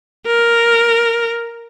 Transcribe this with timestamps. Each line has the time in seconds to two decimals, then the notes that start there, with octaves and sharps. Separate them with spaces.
0.26 A#4